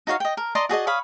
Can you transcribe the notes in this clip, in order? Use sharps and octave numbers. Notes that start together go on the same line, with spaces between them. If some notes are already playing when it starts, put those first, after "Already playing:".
D#4 F#4 C#5 F5
D#5 G5
A#4
D5 D#5 A#5 C6
F#4 G#4 D5 D#5
C#5 F5 B5 D#6